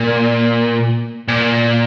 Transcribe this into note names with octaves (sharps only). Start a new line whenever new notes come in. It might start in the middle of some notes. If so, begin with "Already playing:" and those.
Already playing: A#2
A#2